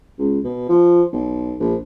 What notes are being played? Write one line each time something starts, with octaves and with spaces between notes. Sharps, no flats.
C#2
B2
F3
B1
A#1